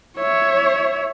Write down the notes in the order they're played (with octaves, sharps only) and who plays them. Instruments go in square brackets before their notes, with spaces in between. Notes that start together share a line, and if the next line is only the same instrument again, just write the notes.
[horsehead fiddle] C#5 E5